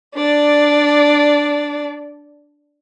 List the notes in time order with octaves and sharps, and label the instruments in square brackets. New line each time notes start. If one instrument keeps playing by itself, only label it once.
[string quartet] D4 D5